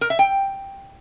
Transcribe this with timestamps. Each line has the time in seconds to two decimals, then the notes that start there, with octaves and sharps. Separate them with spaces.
0.01 A#4
0.10 E5
0.19 G5